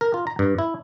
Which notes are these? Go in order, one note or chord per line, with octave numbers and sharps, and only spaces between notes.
A#4
F4
A#5
G2
E4